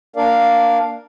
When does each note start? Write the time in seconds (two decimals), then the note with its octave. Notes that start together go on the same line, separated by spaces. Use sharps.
0.16 A#3 D4 A#4 D5 F5